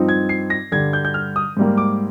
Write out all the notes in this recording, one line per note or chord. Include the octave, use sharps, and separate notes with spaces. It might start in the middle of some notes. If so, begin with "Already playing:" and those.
Already playing: G2 F3 C4 D#4
G#6
C7
A#6
G2 D3 G3 G#6
G6
G6
F6
D#6
G#2 G3 A#3
D6